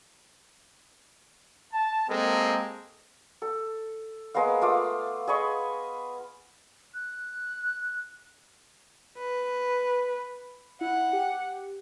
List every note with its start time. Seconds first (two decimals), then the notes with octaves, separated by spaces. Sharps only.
1.73 A5
2.09 G#3 A#3 C4 G4 A4 A#4
3.42 A4
4.34 G#3 A#3 B3 F5
4.61 A3 F4 D6 D#6
5.27 G#4 D#5 B5 C#6
6.94 F#6
9.18 B4
10.81 E4 F#5
11.13 G4